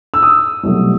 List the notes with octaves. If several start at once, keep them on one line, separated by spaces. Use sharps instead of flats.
E6
D#6
C2 B2 F#3 A3